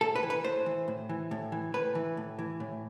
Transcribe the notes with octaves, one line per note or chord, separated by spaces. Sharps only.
A2 A4
B4
E3
B4
A2 C5
E3
A2
E3
A2
E3
A2 B4
E3
A2
E3
A2